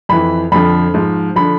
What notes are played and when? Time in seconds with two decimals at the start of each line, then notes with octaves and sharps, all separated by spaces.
0.09 F2 E3 B5
0.52 F2 D3 F3 B5
0.94 G#2 F3
1.36 D3 F3 B5